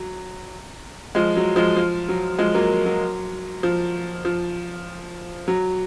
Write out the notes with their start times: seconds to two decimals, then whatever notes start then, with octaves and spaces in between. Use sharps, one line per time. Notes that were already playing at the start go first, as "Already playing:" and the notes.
Already playing: F#3
1.15 F3 G#3
1.37 F#3
1.56 F3 G#3
1.77 F3
2.08 F#3
2.38 F3 G#3
2.54 F#3 A#3
2.86 F#3
3.63 F3
4.25 F3
5.48 F#3